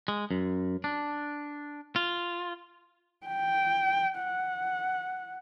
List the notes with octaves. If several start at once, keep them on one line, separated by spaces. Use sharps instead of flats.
G#3
F#2
D4
F4
G5
F#5